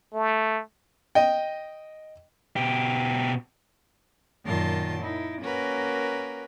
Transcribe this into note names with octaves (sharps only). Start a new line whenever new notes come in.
A3
D#5 G5
B2 G4
F#2 A#2 D#3 F4 A5 C6
D#4 E4
A#3 C#4 F#4 A#4 B4